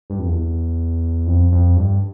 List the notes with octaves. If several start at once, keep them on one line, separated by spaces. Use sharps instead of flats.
G2
F2
E2
F2
F2
G2